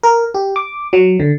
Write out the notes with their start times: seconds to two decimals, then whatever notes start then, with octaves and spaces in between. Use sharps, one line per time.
0.03 A#4
0.34 G4
0.56 D6
0.93 F#3
1.20 D3